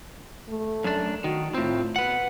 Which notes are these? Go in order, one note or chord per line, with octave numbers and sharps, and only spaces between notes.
A3
F#2 D4
D#3 F#4
A2 C4 F4
B2 B4 F#5